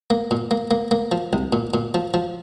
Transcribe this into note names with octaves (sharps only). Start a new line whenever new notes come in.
A#3
A#2
A#3
A#3
A#3
F3
C2
A#2
A#2
F3
F3